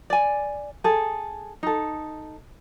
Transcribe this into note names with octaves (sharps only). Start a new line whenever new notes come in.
D5 G#5
G#4 A4
D#4 A4